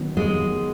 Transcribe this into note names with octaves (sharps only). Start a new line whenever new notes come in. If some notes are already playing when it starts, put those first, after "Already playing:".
Already playing: D#3 F#3 B3
G#3